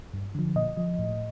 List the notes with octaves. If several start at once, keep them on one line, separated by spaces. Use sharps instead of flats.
G2
D3 F3
A#2 D#5
F3
A2